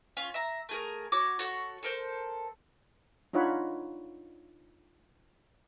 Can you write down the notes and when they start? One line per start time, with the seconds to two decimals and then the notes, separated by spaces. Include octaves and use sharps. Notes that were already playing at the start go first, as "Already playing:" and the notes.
0.17 C#4 F4
0.34 E5 A#5
0.69 A3 G#4 A#4
1.12 F#4 C#5 D6
1.39 F#4 A4 C#5 F#5
1.83 A4 A#4 C5
3.33 D4 D#4 F4 C#5 F#5 B5